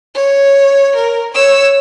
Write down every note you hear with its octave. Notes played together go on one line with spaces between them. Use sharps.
C#5
A#4
C#5 E6